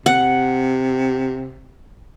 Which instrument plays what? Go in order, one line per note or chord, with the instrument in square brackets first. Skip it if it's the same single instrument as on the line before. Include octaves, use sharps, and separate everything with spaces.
[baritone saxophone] C3 [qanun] F#5